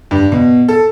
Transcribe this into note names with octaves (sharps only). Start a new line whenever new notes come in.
G2
B2
A4